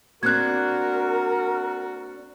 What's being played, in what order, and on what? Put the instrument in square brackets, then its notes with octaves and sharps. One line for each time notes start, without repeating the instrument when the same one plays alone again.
[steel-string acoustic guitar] A#3 C4 D4 [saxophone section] F#4 [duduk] A#4 [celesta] F#6 G#6